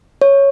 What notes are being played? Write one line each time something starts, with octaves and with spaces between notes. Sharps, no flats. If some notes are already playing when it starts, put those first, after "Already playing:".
C#5